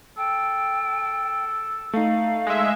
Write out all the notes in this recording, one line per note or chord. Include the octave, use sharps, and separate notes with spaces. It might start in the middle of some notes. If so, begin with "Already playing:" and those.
A4 G5
A3 D#4 F5
G#3 E5